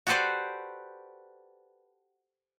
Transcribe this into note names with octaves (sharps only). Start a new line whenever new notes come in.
F#4 G4 A4 B4 C5 D5